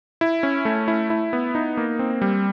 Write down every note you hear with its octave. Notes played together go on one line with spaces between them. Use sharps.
E4
C#4
A3
E4
E4
B3
D#4
A#3
C4
G3